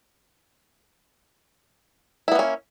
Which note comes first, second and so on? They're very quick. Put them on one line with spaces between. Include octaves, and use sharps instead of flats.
E4 B3 A#3 C#4